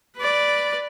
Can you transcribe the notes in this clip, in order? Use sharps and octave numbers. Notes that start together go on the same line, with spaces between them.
B4 D5